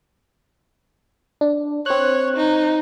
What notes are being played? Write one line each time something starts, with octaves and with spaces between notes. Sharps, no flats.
D4
C4 C#5 F#6
D#4